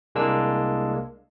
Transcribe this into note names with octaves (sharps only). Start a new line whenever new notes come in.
C2 G#3 A#3 D4 E6